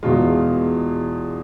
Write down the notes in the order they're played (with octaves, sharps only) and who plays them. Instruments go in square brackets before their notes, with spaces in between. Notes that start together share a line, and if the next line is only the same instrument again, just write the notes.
[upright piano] E2 B2 G#3 F4